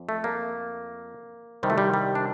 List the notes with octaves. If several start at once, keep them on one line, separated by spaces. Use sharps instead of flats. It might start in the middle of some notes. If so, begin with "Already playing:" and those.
Already playing: F2
A3
A#3
C2 C3 D#3 G3
A3
G3
G3
D4